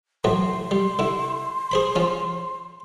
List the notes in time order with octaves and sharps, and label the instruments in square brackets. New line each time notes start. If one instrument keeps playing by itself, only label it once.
[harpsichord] A1 F#3 A3 [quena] C6
[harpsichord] G3
D3 E4
G#4 C5 B5
F3 C#4